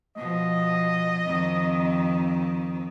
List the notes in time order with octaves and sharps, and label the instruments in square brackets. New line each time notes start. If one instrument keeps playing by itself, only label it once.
[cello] B2 F3 [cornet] D#5
[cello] F2 D#3